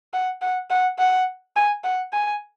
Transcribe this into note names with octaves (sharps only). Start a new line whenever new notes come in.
F#5
F#5
F#5
F#5
G#5
F#5
G#5